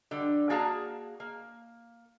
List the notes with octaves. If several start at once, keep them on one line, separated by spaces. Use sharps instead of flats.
D3 G3
A#3 F#4 G#4 F5 A5 A#5
A#3